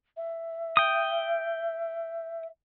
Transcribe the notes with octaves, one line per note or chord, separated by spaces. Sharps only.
E5
G5 D#6